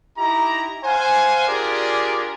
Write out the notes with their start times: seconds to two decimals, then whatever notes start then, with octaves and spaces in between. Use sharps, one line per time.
0.17 D#4 E4 G4 A#5
0.84 C5 F5 F#5 G#5
1.47 D4 F4 G4 G#4 A#4 D5